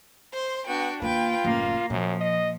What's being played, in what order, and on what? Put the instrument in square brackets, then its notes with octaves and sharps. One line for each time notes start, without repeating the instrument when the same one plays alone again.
[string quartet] C5 C6
[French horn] B3 [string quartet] D4 F#4 G5
[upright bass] D#2 A#3 [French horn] F4 [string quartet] B4 G5
[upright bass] F#1 A2 [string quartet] A#3
[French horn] F#2 [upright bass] A#2 [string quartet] F3
[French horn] D#5